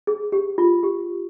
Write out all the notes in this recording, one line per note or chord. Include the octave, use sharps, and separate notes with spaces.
G#4
G4
F4
G4